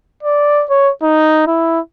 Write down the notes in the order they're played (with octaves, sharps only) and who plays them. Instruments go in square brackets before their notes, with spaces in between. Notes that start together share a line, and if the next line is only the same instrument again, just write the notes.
[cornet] D5
C#5
D#4
E4